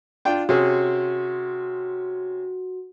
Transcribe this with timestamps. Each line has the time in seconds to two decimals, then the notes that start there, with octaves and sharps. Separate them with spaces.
0.25 D4 F4 G5
0.49 C3 C#4 F#4 G#4